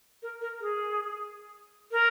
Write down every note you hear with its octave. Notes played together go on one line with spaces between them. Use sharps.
A#4
A#4
G#4
A#4